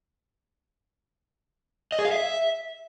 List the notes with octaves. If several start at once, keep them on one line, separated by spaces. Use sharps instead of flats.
D#5
G#4
F5
E5